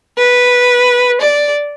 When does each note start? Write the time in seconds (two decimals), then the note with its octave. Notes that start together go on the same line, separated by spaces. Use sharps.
0.18 B4
1.21 D5